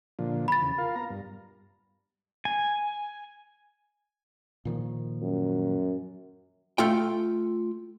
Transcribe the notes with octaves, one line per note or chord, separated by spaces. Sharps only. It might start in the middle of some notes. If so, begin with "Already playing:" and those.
A#2 D3 F3
B5 A6
E2 C#3
F4 A#4 F5
B3 A#5
G2
G#5
A#2 D#3 F3
F#2
A3 F4 G5